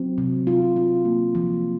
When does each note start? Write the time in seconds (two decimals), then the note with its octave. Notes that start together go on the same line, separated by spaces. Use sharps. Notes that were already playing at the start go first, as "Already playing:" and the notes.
Already playing: F#3 C4
0.18 C3
0.47 F4
0.76 F4
1.05 A#3
1.35 F3